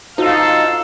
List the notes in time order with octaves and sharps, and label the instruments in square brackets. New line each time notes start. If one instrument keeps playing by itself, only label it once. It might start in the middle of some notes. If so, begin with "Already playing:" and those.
[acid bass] D#4 [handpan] F4 F#4 C5 [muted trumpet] A4 [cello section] F5